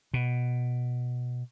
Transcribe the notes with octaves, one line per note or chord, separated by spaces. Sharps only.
B2